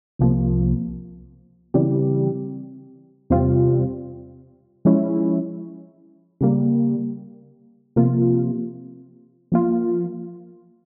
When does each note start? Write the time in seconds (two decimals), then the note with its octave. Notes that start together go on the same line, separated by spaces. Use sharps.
0.19 C2 C3 F3 A#3
1.74 C#3 E3 G3 C4 G4
3.30 E2 C3 G3 C4 F4
4.85 F3 G#3 C#4 E4
6.41 C#3 G3 A#3
7.96 C3 F3 A#3 F4
9.52 F3 A#3 F4